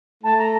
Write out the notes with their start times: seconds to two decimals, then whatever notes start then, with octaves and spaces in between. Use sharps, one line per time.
0.23 A3 A5
0.39 A#5